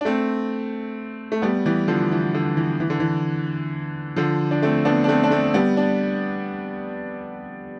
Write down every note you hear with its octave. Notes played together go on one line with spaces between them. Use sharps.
D4
A3 C4
A3
G3 B3
E3 G3
D3 F3
E3
D3
E3
E3
D3
E3
D3 F3
D4
A3 C4
B3 D4
D4
A3 C4
D4
A3 C4
G3 B3
D4